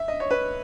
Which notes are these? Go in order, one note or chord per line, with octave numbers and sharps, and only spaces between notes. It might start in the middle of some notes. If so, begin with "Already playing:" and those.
Already playing: E5
D#5
C#5
B4